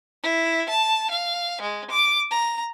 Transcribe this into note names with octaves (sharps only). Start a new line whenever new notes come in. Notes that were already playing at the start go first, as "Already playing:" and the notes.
E4
A5
F5
G#3
D6
A#5